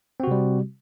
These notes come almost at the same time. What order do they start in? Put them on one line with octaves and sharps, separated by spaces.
C4 F#4 C3 G3